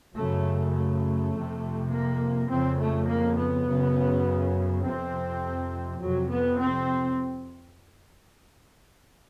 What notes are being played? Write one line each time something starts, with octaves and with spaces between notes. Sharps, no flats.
F#2 C#3 A3
A3
F2 C3
A#3
F2 C#3 C4
A3
A#3
B3
F#2 C#3
F2 C3 C4
F2 C3 F#3
B3
C4